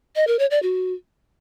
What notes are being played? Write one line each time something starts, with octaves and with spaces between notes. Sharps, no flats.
D#5
A#4
C#5
D5
F#4